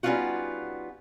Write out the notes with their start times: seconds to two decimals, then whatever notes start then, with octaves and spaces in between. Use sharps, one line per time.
0.03 G3 B3 C#4 D#4 F4 F#4